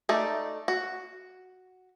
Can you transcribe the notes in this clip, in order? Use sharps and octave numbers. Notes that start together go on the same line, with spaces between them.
A3 D#4 D5
F#4